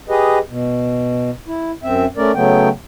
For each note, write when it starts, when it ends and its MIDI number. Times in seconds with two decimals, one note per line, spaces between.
0.09 0.39 67
0.09 0.39 68
0.09 0.39 71
0.09 0.39 75
0.48 1.30 47
1.48 1.72 64
1.83 2.06 42
1.83 2.06 60
1.83 2.06 76
2.17 2.32 57
2.17 2.32 61
2.17 2.32 70
2.17 2.32 74
2.35 2.69 49
2.35 2.69 54
2.35 2.69 57
2.35 2.69 59
2.35 2.69 79